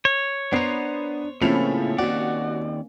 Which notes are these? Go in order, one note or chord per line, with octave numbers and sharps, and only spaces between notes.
C#5
B3 D4 C5 A#5 C7
A2 C#3 F3 A#3 C4 C#4 E4 F7
D#2 F#4 D5